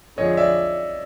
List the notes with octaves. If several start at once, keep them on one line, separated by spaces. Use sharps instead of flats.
F2 D3 F3 G#3 C#5 D#5
D5 E5